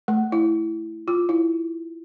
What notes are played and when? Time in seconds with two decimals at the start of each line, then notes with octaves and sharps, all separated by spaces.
0.08 A3
0.32 E4
1.08 F4
1.29 E4